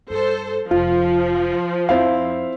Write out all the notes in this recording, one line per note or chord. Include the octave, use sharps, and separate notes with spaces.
G2 A4 C5
F1 F3 F4
F2 C4 E4 F5